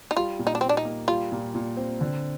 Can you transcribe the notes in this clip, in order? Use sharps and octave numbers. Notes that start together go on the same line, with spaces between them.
D#4
G3 F4
A#2
D#4
D4
A#2 C4
D4
D#4
A#3
G3 F4
A#2
A#2
C4
D3